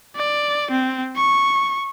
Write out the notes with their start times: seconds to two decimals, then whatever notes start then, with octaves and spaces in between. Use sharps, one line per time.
0.16 D5
0.71 C4
1.16 C#6